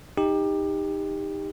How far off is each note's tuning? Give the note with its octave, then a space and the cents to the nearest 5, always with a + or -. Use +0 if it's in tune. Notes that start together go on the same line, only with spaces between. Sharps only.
D#4 +0 G4 +20